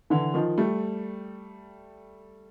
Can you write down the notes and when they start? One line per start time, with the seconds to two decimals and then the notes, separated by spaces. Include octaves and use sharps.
0.10 D3 E3
0.34 D#3 F3
0.58 G3 A3